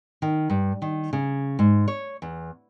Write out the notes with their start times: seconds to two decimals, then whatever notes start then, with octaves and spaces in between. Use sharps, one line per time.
0.22 D#3
0.50 G2
0.82 D#3
1.13 C#3
1.59 G#2
1.88 C#5
2.22 E2